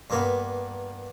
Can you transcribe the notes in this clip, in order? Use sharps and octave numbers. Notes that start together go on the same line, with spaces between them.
G2 A#3 B3